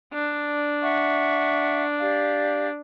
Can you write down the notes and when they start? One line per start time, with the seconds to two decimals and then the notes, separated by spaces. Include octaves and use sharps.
0.13 D4
0.81 E5 F#5 C#6
1.99 G4 D5 F5